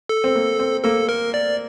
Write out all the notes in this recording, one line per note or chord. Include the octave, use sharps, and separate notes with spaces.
A4
C4
A#3
C4
A#3 A4
A#4
D5